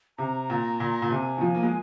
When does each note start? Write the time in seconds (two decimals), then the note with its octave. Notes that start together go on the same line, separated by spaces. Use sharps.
0.18 C3 A#5
0.50 A#2
0.80 A#2
1.02 A#2
1.10 C3 G#5
1.37 D#3
1.41 F3
1.55 A#3
1.63 G#3